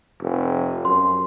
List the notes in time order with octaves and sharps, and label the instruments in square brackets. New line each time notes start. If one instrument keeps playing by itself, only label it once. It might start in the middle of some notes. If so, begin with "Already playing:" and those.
[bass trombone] F1
[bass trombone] F#2 [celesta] C6